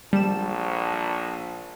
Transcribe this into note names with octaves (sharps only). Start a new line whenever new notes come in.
A#1 G3 A4 E7